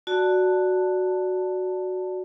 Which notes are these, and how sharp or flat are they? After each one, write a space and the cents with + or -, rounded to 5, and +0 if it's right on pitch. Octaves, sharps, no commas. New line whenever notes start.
F#4 +0 D5 +0 A5 +10